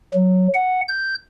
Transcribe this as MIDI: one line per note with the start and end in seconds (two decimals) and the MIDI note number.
0.14 0.48 54
0.54 0.81 78
0.88 1.14 91